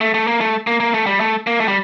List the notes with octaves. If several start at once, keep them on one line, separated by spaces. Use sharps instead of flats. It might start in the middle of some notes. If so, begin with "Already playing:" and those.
A3
A3
A#3
A3
A#3
A#3
A3
G3
A3
A#3
A3
G3